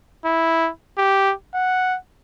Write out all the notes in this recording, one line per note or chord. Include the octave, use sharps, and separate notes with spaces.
E4
G4
F#5